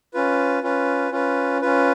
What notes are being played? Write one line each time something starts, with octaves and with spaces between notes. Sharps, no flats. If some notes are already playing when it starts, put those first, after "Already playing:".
C#4 F4 B4
C#4 F4 B4
C#4 F4 B4
C#4 F4 B4